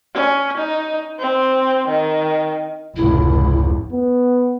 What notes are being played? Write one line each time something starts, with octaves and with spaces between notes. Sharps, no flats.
C#4
D#4
C4
D#3
F1 C#2 G#2 E4
B3